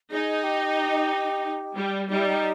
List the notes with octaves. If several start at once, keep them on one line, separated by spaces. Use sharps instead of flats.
D#4 G#4
G4
G3
G3 D#4
E4
D#4